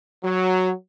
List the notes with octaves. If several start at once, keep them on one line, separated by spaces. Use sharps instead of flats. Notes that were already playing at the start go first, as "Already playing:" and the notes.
F#3